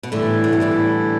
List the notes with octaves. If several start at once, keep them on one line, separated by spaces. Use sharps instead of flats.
B2
A2 D3 E3 G3 E4
D3
B2
A2 D3